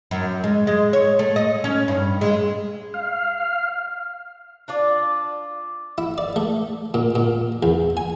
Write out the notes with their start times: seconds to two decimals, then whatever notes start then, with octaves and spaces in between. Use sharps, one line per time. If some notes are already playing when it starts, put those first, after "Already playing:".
0.11 F#2
0.44 G#3
0.67 G#3
0.93 C#5
1.19 A3
1.36 D#5
1.64 C#4
1.88 G2
2.21 G#3
2.94 F5
4.68 D4 F4 D5
5.98 E4
6.18 D5
6.36 A3
6.94 A#2
7.15 A#2
7.63 E2
7.97 G#5